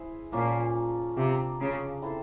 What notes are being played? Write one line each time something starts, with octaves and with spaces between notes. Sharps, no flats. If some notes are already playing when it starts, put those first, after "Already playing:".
Already playing: E4 G#4 C5 E5
A#2 F3 A#3 C#4 F4
C3 G3 A#3 D4
C#3
C4 E4 A4 C5